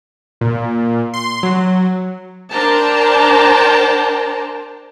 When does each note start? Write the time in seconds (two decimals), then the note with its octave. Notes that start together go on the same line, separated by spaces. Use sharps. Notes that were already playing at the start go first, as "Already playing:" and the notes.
0.41 A#2
1.14 C6
1.43 F#3
2.51 D4 A#4 C5 G5 A5 A#5